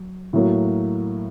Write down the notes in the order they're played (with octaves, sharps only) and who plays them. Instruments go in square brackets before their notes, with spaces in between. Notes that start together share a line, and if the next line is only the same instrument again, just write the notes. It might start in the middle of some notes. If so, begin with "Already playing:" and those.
Already playing: [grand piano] F#3
A2 F#3 A#3